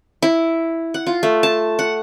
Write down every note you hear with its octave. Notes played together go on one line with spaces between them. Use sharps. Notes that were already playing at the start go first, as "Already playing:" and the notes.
E4
F#5
F4
A3
A5
F#5